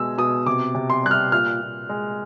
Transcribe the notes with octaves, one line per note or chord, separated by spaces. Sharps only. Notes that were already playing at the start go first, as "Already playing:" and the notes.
Already playing: B2 G#3 E6
B2 D#6
C3 D6
C3
C6
G3 F#6
F6
A#2 F6
A#2
G#3